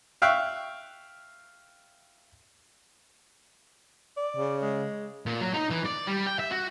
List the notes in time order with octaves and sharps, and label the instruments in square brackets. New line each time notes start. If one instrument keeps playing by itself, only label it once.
[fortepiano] E5 F5 G5 C#6 F#6
[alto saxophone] D5
[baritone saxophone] C#3
[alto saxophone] G#3
[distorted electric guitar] A#2
F#3
D#4
E3
D5
G3
G5
E5
F#4